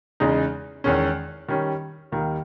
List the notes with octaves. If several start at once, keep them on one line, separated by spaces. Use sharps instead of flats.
E2 C#3 G#3 D#4
E2 D#3 G#3 C#4
D#3 G3 C#4
D#2 D#3 G3 A#3